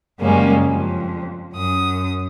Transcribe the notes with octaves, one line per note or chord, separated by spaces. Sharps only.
F#2 C#3 G3 G#3 A#3 C#4
F2
F#2 D#6